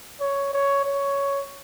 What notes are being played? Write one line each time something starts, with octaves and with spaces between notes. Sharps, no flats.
C#5
C#5
C#5